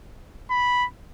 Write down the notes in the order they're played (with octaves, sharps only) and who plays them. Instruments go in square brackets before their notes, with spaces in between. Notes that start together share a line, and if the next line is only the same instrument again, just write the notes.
[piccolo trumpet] B5